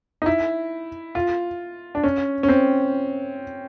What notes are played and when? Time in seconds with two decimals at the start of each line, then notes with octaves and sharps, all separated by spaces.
0.22 D#4
0.26 E4
1.15 F4
1.95 D4
2.04 C#4
2.43 C#4
2.48 C4